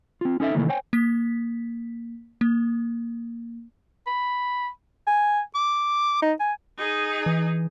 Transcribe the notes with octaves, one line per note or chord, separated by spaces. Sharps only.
C4 F4
C#4 D#4 A4 D5 E5
C3 D#3 E3 A3 A#3
C5 C#5 G5 G#5
A#3 B6
A#3
B5
G#5
D6
D#4
G#5
D#4 G#4
E3